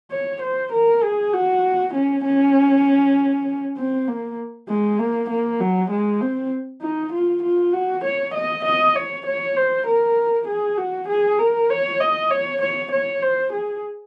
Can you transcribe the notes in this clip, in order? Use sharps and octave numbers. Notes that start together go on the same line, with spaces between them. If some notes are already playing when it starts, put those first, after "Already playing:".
C#5
C5
A#4
G#4
F#4
C#4
C#4
C4
A#3
G#3
A#3
A#3
F#3
G#3
C4
D#4
F4
F4
F#4
C#5
D#5
D#5
C#5
C#5
C5
A#4
G#4
F#4
G#4
A#4
C#5
D#5
C#5
C#5
C#5
C5
G#4